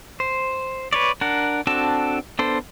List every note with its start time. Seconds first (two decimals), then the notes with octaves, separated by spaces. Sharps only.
0.20 C5
0.93 B4 C#5 D5
1.21 D4 A#4 F#5
1.67 C4 D4 F#4 A4 A5
2.39 B3 D4 A4 C5